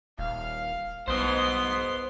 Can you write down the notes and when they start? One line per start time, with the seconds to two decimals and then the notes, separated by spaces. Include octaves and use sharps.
0.19 D#1 F5
1.08 B1 B3 C5 D#5 C6